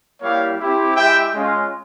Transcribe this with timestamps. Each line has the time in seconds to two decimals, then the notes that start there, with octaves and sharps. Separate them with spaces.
0.20 G3 A#3 E4 G4 C#5 F5
0.58 C4 E4 G4
0.96 G#3 E4 G4 E5 G5
1.34 G#3 C#4 F4